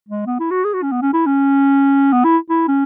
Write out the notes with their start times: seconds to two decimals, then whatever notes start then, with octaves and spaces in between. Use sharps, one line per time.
0.09 G#3
0.26 B3
0.39 E4
0.51 F#4
0.64 G#4
0.73 F#4
0.82 C#4
0.92 B3
1.01 C#4
1.13 E4
1.26 C#4
2.12 B3
2.24 E4
2.50 E4
2.68 C#4